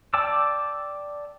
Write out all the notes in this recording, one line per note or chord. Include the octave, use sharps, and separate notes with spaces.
D5 G5 A5 D6 E6